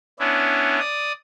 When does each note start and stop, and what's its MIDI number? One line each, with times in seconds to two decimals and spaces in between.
0.19 0.79 59
0.19 0.79 61
0.19 0.79 62
0.19 0.79 64
0.80 1.12 74
0.80 1.12 87